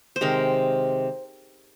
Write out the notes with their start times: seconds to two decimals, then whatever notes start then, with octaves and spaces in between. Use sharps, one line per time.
0.16 C5
0.21 C3 D#3 G#3 A#4